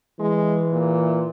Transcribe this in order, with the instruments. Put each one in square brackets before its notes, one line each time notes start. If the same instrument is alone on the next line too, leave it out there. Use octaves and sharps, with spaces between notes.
[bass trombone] E3 [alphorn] G#3
[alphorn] A#2